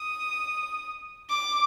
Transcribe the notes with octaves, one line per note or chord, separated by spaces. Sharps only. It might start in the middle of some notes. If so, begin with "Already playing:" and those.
Already playing: D#6
D6